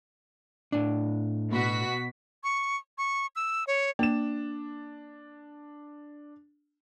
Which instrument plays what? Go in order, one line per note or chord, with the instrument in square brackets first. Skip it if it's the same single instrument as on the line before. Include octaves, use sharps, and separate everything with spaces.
[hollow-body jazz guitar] A2 D4
[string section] B2 F#4 B6
[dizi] C#6
C#6
E6
C#5
[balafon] A#3 [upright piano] D4 E7